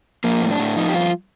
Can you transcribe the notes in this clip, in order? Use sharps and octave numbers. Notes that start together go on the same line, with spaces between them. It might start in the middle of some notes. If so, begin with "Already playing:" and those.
F3 A#3
A2
D4
A2
F3 D#4
G4
G2 F4